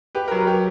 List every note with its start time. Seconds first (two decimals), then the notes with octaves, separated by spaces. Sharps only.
0.15 G4 B4
0.28 F#3 A#4
0.41 B4
0.47 G4